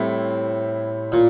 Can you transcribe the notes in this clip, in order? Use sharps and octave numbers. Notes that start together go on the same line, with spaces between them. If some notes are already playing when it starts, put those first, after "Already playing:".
Already playing: A2 G3 C4 E4
A#2